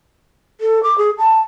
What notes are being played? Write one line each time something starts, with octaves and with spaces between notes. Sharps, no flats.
A4
D6
G#4
A5